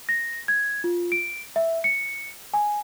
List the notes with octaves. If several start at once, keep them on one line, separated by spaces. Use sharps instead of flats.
A#6
G#6
F4
D7
E5
C#7
G#5